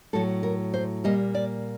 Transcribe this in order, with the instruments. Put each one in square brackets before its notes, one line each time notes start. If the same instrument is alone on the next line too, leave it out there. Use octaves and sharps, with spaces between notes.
[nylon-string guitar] A2 F#3 A3 A4
A#4
C5
A#2 G3 A#3 D#5
D5